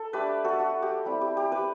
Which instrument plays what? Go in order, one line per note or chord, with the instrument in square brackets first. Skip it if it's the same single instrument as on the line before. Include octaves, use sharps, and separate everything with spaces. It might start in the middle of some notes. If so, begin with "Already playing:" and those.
Already playing: [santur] A4
A3 D4 G4 B4
F#4 A4
F#4
G4
G3 C4 E4
G4
G4
G4 B4